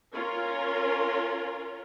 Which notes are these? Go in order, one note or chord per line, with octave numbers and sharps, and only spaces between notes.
C#4 F4 A#4